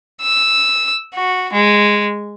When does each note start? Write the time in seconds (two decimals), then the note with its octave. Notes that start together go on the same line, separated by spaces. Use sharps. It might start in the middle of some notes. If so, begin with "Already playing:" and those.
0.22 E6
1.15 F#4
1.53 G#3